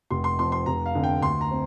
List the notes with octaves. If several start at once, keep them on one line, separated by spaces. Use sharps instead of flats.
F1 C6
C6
F2 F3 C4 C6
C6
F1 A#5
F5
F2 D3
G5
D2 C6
A#5
C4